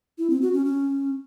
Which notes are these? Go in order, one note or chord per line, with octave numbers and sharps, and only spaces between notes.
E4
C4
F#4
C#4
C#4